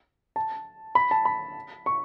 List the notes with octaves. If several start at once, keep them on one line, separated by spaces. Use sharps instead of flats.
A5
B5
A5
B5
C#6